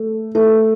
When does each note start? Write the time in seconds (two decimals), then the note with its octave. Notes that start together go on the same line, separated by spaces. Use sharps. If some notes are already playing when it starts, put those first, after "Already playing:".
Already playing: A3
0.35 A3